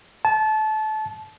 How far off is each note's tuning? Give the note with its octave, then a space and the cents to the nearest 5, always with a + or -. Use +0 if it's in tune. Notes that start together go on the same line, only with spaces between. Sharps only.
A5 -25